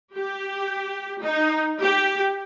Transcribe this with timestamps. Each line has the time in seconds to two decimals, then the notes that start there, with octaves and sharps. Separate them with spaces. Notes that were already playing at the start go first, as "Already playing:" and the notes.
0.16 G4
1.23 D#4
1.82 G4